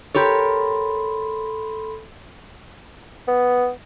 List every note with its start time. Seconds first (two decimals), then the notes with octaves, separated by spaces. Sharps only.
0.15 G4 A4 A#4 C#5 B5 C6
3.27 B3